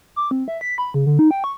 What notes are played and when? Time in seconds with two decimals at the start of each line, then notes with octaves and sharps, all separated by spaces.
0.16 D6
0.31 C4
0.48 E5
0.61 B6
0.78 B5
0.94 C#3
1.06 D3
1.19 D#4
1.31 G5
1.44 C#6